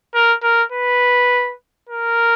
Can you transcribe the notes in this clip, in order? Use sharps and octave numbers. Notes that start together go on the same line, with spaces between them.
A#4
A#4
B4
A#4